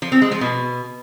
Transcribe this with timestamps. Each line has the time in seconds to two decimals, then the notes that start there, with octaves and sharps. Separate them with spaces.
0.02 F3
0.12 C4
0.22 G#3
0.31 F3
0.41 B2